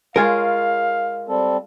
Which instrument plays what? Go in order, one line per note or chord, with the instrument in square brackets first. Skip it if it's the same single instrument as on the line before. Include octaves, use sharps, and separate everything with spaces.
[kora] G#3 F4 C#5 [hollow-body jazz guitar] A#4 G#5 [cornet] F5
[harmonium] G3 C4 A4